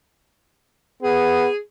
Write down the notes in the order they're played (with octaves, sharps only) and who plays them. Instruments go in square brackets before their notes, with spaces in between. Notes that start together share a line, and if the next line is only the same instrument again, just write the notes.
[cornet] B3 [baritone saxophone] G#4